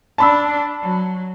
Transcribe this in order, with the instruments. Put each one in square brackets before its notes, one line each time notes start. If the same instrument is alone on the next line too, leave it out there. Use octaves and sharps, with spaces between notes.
[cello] D4 [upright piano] A5 B5 E6
[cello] F#3